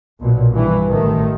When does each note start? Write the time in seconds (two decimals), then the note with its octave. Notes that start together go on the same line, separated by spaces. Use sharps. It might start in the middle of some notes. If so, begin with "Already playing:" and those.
0.20 B1 A#2
0.52 G2 E3
0.88 A1 D#3 A3